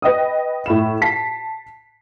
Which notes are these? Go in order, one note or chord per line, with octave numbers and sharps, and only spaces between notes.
B4 D#5 G5 D#6
A2 B5 E7
A5 B6 C7